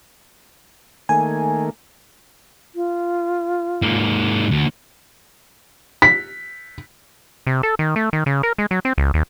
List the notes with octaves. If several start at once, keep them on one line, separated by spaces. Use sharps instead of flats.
D#3 A3 A#3 G#5
F4
G#2 A#3
D2
B6
C3
A4
D#3
A3
D#3
C#3
A#4
G#3
F#3
C4
C#2
D#2